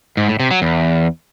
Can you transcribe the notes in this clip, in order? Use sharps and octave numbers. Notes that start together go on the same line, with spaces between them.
G#2
A2
C3
F#3
E2